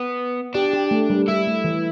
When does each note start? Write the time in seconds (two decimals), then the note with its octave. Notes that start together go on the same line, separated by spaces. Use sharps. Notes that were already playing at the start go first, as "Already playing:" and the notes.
Already playing: B3
0.55 D4 G4
0.73 G4
0.91 A3
1.10 G3
1.28 G3 E4
1.47 A3
1.64 E3